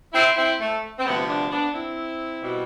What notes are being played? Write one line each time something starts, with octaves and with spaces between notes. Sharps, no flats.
C4 E4
C4 E4
A3
C4
D2 C3 F3 B3
B3 D4
B3 D4
C4 E4
B2 G3